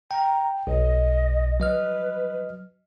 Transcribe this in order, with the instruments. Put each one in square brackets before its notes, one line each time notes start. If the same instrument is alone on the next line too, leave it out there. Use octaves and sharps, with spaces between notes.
[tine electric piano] G5 [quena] A#5
[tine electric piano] B1 [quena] D#5
[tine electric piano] F#3 D#5 F6 [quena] B4